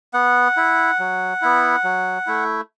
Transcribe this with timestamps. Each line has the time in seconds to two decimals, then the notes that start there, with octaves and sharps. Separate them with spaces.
0.13 B3 F#5
0.57 E4
0.99 F#3
1.42 B3 E4
1.84 F#3
2.27 A3 E4